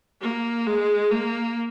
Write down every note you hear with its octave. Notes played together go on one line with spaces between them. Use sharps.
A#3
G#3
A#3